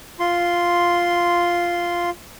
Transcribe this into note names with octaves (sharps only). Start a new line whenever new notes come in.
F4 C6